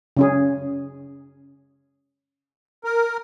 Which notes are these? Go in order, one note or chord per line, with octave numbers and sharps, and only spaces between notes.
C#3 C#4 G#4
A#4